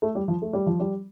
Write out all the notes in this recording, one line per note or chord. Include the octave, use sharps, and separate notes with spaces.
A3
G3
F3
A3
G3
F3
G3